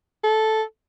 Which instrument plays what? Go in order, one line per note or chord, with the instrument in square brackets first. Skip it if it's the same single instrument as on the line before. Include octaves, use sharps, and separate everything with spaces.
[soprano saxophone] A4